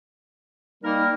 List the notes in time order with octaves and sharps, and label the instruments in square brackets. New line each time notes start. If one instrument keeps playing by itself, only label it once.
[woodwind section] G3 A#3 A#4 [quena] D#4